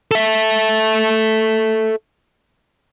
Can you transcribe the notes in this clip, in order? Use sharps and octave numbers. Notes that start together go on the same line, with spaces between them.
A4 E5